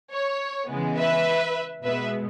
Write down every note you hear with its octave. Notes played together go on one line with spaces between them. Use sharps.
C#5
C#3 E3 G#3 B3
B4 E5
B2 G#3 B3 B4 E5